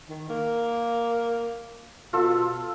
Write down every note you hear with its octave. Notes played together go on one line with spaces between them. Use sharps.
D#3
A#3
B2 F4 A4 E6